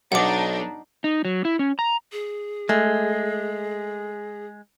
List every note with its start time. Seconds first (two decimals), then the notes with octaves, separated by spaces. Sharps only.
0.12 B1 D4 D#4 F#5 D6
1.04 D#4
1.25 F#3
1.45 E4
1.59 C#4
1.79 A#5
2.12 G#4
2.69 G#3 A3